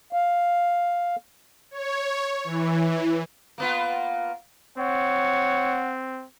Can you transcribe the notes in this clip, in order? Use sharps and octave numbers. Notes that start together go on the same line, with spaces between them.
F5
C#5
E3
A#3 B3 F4
C4 C#5 F#5